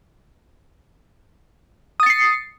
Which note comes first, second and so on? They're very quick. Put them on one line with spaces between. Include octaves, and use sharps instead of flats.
D#6 A6 C#7 C7